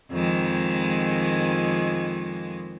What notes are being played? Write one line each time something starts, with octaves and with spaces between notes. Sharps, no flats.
F2 D#3 G#3